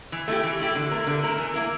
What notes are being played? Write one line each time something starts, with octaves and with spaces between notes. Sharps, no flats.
E3
A3 E4 G4
E3
A3 E4 G4
D3
A3 E4 A#4
D3
A3 E4 A#4
E3
A#3 E4 A#4